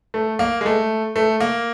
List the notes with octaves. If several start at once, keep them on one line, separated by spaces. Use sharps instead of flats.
A3
A#3
G#3
A3
A3
A#3